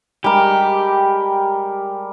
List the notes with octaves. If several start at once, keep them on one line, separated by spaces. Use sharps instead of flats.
G3 G#3 G4 A#4